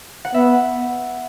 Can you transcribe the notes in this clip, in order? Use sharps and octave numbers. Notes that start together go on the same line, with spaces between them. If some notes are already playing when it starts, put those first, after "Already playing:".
F#5
B3 E5